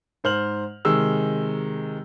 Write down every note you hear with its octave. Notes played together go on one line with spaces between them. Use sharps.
G#2 C5 F6 F#7
C3 D#3 G#3 E6